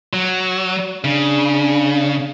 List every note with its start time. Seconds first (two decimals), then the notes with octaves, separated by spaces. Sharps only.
0.13 F#3
1.04 C#3 D4